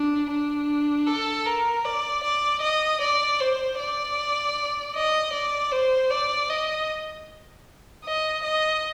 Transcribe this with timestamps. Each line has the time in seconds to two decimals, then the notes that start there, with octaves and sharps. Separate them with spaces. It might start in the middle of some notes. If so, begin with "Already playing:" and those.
Already playing: D4
0.30 D4
1.07 A4
1.46 A#4
1.85 D5
2.23 D5
2.62 D#5
3.01 D5
3.40 C5
3.79 D5
4.95 D#5
5.33 D5
5.72 C5
6.11 D5
6.50 D#5
8.05 D#5
8.43 D#5